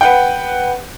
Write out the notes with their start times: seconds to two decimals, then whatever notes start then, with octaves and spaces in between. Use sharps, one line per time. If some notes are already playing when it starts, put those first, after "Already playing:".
0.01 B4 F#5 G5